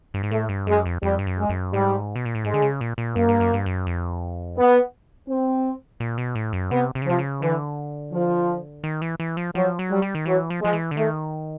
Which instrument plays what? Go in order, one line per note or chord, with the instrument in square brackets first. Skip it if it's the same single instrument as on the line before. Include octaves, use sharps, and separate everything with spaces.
[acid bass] G2
G#2
[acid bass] A2 [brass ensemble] A3
[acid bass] G2
[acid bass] F#2 [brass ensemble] G#3
[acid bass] F2
[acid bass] F2 [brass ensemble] G3
[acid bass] G2
F#2
[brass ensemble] G#3
[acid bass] F#2
[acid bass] G#2 [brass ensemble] G3
[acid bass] B2
A#2
A2
[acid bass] G#2 [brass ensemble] G#3
[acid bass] D3
C#3
A#2
A#2
[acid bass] F#2 [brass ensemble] A#3
[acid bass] G2
F#2
G2
F#2
F2
[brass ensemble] B3
C4
[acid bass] A#2
B2
A2
F#2
[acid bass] C3 [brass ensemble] B3
[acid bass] C3
C#3
[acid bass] C3 [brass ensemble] F3
[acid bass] C#3
[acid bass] D3 [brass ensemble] E3
[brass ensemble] F3
[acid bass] D#3
E3
E3
F3
[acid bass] F3 [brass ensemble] F#3
[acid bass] F#3
[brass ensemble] G3
[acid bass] G3
D#3
[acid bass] E3 [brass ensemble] F#3
[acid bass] F3
[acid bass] F3 [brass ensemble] G#3
[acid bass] E3
D3
[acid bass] D#3 [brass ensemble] A3